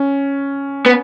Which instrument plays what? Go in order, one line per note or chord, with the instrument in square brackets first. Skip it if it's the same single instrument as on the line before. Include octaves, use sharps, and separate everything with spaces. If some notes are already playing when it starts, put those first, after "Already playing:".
Already playing: [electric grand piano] C#4
[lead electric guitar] B3